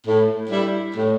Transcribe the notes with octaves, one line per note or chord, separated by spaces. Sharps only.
A2
G3 E4
A2